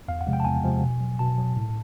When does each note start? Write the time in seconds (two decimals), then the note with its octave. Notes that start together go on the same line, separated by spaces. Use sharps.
0.08 E2 F5
0.21 F#5
0.27 C3 F3 G#3
0.33 G5
0.40 A5
0.45 E2 G#5
0.64 C3 F3 G#3
0.83 B2
1.01 F#3
1.19 B2 A5
1.38 F#3
1.56 A2